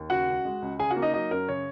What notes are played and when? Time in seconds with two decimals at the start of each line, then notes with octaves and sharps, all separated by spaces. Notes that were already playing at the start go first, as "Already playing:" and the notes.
Already playing: D#2
0.10 C#3 F#4 F#5
0.28 C#2
0.45 G#3
0.62 C#2
0.79 C#3 G#4 G#5
0.90 F#4 F#5
0.97 A#3
1.02 D#4 D#5
1.14 F#3 D#4 D#5
1.31 F#2 A#4
1.48 C#3 C#5